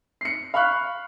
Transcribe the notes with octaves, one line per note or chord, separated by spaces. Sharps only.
C7 C#7
F5 B5 C#6 F6 F#6